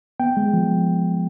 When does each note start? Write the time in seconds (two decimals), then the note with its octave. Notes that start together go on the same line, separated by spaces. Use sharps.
0.20 B3 G5
0.37 G#3
0.53 F3